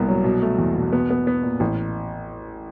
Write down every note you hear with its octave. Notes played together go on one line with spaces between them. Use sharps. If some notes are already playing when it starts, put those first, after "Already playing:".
Already playing: C2 A#2 B3
F#3
B2
A3
E2
B2
B3
B3
B3
A#2
A1